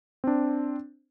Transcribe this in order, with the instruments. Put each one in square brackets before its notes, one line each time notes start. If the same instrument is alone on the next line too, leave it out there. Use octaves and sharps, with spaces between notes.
[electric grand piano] C4 D4